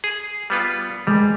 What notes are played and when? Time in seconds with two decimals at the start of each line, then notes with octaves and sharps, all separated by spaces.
0.04 G#4
0.50 G3 B3 F4
1.07 G3 G#3